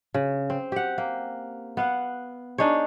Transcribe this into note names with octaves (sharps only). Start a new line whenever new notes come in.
C#3
C4
G4 F#5
A#3
B3 F5 F#5
D4 D#4 G#4 C#5